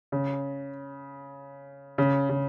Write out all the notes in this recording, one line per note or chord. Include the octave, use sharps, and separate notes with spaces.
C#3
C#3
C#3